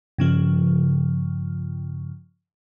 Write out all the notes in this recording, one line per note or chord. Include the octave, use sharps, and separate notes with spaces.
G2 C#3 F3